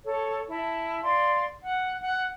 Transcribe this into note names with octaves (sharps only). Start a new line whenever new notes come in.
A4 C#5
E4 A5
D5 F5 C6
F#5
F#5